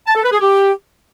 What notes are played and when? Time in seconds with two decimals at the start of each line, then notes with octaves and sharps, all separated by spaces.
0.07 A5
0.15 A4
0.24 B4
0.32 G#4
0.41 G4